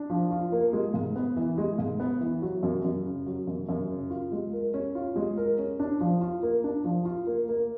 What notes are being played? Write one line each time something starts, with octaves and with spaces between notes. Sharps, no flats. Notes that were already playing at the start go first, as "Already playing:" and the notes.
Already playing: D4
F3
F4
A#3
G#3
G#2
B3
E3
G#3
G#2
B3
E3
F#3
F#2
F#2
C#3
F#3
F#2
F#2
C#3
F4
G#3
A#4
C#4
F4
G#3
A#4
C#4
D4
F3
F4
A#3
D4
F3
F4
A#3
A#3